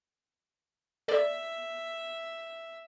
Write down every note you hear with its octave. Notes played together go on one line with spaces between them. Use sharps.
A4 D5 E5